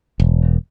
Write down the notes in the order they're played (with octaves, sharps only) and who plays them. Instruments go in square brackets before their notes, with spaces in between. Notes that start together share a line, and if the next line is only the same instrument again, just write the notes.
[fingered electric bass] E1